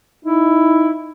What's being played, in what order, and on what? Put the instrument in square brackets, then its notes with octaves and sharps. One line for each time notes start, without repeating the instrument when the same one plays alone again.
[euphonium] D#4 [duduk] E4